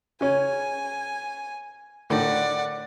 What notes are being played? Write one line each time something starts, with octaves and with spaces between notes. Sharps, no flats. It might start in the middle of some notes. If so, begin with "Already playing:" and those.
C#3 C#4 G#5
A2 D3 D#3 D5 F#5